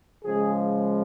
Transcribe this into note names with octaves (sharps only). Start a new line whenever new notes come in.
C#3 F3 G#3 G#4